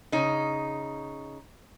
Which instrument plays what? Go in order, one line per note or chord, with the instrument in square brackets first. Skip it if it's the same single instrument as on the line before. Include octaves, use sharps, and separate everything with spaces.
[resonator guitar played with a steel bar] C#3 D#4